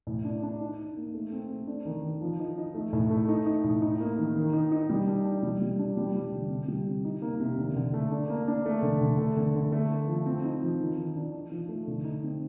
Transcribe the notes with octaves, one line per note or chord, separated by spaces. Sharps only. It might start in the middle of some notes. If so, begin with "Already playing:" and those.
A2
D4
D4
D#4
D#4
A#3
A3
C4
A3
D4
D#3
D#3
F3
D#4
D#4
A3
A2
A3
D#4
D#4
A2
D#4
A#3
D#3
D#3
D#4
D#4
G3
D4
D4
G3
G3
D4
G3
G3
D3
C3
G3
C3
D#4
A#3
C3
D3
D3
A3
D4
A#3
D4
A3
D3
D3
A3
D3
D3
A3
A3
F3
C4
D#4
F3
D#3
D#3
D4
D#4
F3
A3
D3
D#4
C4